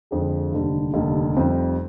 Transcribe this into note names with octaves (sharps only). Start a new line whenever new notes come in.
F2 D3 G#3
F1 D#2 D3 G3
F1 D#2 D3 G3
F1 F2 C3 G3 C4